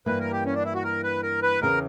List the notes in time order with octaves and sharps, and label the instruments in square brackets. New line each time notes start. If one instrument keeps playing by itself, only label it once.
[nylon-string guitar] G2 E3 A#3 [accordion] B4
[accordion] A#4
G4
C#4
D4
E4
F#4
A#4
B4
A#4
B4
[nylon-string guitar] E2 C#3 E3 [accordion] A#4